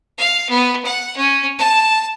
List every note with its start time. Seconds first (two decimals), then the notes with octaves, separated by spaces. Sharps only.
0.18 F5
0.50 B3
0.85 F#5
1.17 C#4
1.59 A5